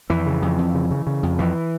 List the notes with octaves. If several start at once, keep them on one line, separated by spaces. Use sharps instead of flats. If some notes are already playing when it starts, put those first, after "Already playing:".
F2 E3
C#3
F2
F2
C#3
C#3
C#3
F2
F2 E3